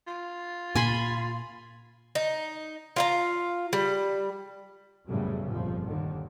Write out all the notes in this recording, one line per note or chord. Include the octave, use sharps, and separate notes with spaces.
F4
A#2 G#5 B5 C6
D#4
F4 F5 A#5
G3
A#1 F#2 A2 C#3 G3 B3
G1 F2 A#2 F3
D#2 D3 D#3